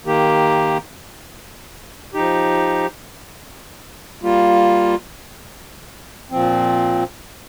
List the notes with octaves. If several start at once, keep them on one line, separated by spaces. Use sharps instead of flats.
D#3 A#3 G4
F3 D#4 G4
G3 A#3 F4
A#2 F3 C4